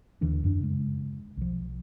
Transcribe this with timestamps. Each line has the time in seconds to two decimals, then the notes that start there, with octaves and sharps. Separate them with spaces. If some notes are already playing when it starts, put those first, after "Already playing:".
0.21 D#2 D3 E3 D4
0.44 F#2 D4
0.61 C#3 G#3
1.37 B1 F3